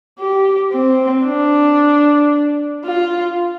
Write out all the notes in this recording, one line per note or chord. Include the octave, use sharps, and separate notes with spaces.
G4
C4
D4
F4